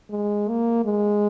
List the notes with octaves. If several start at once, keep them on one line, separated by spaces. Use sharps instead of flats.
G#3
A#3
G#3